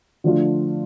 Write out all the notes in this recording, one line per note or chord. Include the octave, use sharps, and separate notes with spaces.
D3 F3 A3 D4 F4